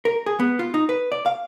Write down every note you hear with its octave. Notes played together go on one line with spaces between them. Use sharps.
A#4
G#4
B3
F4
D#4
B4
D5
F5